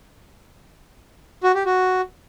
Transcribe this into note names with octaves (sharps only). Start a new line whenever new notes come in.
F#4
G4
F#4